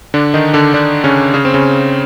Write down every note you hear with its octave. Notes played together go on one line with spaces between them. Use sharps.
D3 D4
D#3 D#4
D3 D4
D3 D4
C#3 C#4
C#3 C#4
C4
C#3 C#4